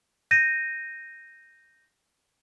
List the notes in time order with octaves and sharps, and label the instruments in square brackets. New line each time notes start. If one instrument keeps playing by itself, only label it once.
[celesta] G6 A#6 D#7